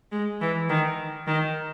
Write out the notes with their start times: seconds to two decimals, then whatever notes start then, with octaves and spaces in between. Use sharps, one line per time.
0.12 G#3
0.41 E3
0.69 D#3
1.27 D#3